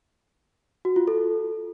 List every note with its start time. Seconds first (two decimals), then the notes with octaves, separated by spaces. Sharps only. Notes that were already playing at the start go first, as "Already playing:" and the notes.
0.85 F#4
0.96 F4
1.07 A4